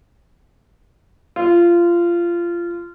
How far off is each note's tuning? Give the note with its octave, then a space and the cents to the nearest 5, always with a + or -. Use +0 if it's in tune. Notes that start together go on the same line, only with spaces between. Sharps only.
F4 -20